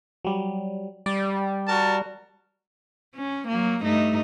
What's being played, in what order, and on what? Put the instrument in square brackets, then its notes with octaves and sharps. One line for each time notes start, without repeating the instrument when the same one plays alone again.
[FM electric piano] F#3 G3
[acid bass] G3 [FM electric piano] D5
[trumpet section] F#4 A#4 A5
[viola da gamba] C#4
F#3 A#3
G2 A3 D#4